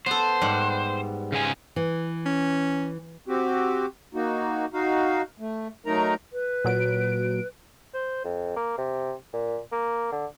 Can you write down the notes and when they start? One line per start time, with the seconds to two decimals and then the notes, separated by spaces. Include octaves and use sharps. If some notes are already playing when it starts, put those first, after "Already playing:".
0.06 B3 A4 C5
0.41 G#2 G3 F#5
1.32 C#3 G#3 G#5
1.76 E3
2.26 C#4
3.28 C4 F#4 G4
4.14 A#3 D#4 F#4
4.73 D#4 F#4 F5
5.39 A3
5.86 F#3 A3 D#4 A#4 A#5
6.33 B4
6.65 A#2 F#3 D7
7.94 C5
8.24 F2
8.56 A#3
8.78 C3
9.33 A#2
9.72 A#3
10.12 D3